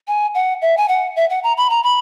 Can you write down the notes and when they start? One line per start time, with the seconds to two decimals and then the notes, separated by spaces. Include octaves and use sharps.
0.08 G#5
0.35 F#5
0.62 E5
0.77 G#5
0.88 F#5
1.16 E5
1.30 F#5
1.43 A#5
1.57 B5
1.70 A#5
1.83 B5